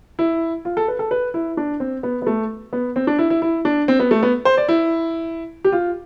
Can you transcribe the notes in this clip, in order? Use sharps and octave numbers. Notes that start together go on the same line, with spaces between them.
E4
F4
A4
B4
A4
B4
E4
D4
C4
B3
B3
A3
B3
C4
D4
E4
E4
E4
D4
C4
B3
A3
B3
C5
D5
E4
G4
F4